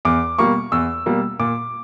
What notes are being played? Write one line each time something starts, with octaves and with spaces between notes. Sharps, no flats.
E2 D6
B2 G3 A#3 C#6
E2 E6
B2 G3 A#3
A#2 D6